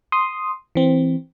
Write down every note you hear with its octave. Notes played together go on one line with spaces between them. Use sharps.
C6 D#6
E3 C4